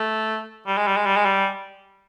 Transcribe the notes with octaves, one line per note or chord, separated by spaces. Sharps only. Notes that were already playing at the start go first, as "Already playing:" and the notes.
Already playing: A3
G3
G#3
G3
G#3
G3
G#3
G3